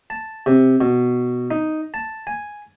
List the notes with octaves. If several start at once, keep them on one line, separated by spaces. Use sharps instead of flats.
A5
C3
B2
D#4
A5
G#5